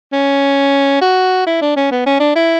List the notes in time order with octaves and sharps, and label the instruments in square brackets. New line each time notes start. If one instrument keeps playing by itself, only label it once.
[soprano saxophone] C#4
F#4
E4
D4
C#4
B3
C#4
D4
E4